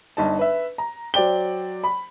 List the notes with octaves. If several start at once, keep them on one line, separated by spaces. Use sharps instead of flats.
G1 D#4 A5
B4 E5
A#5
F#3 C5 D5 G5 G7
B5